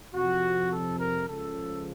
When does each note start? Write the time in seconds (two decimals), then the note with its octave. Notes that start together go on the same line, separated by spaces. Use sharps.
0.15 F2 C3 F3 F#4
0.71 A4
0.99 A#4
1.28 C#2 C#3 F3 A4